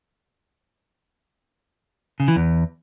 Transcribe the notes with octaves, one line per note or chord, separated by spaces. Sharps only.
C#3
E3
E2